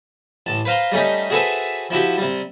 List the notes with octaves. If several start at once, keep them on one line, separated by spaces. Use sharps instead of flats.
A1 A5
B4 C5 F5 A#5 C6
G3 A3 C#4 D#4 G4
F#4 G#4 A4 B4 C5 E5
F3 E4 F#4 G4
C3 G3